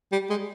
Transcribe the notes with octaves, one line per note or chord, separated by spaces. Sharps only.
G3
G#3